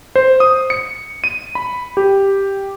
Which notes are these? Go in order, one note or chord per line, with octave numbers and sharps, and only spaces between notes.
C5
D#6
C#7
D#7
B5
G4